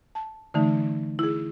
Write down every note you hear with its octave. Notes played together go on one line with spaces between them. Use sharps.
A5
D3 E3 A3 D#4
E4 G#4